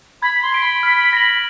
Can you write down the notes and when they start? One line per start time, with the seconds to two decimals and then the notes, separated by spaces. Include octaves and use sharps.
0.22 B5 G#6
0.43 C6
0.52 B6 D7 G7
0.62 B5
0.83 F6
1.13 A#6 D7 F#7